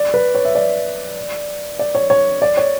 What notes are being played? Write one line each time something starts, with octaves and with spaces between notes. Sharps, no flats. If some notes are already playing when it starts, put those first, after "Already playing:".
Already playing: D5
B4
C#5
E5
D5
D5
C#5
C#5
D5
C#5